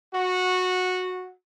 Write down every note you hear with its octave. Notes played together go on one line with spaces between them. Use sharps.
F#4